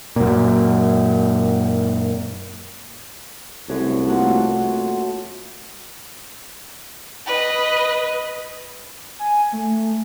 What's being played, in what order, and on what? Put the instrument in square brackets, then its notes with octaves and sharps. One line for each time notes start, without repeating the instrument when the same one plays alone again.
[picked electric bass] F#2 A#2
[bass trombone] C2 [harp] F#2 [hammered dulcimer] A3 C#5
[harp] A3 A#3 F#5 [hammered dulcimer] F4 F#4
[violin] B4 D#5
[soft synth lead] G#5
A3